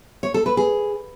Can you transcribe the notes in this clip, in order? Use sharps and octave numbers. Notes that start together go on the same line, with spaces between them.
C#5
A4
B4
G#4